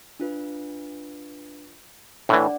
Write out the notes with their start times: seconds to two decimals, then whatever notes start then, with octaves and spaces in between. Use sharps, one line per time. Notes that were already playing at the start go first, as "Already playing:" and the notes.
0.20 D4 F4 B4
2.29 A2 E3 D4 D5 F#5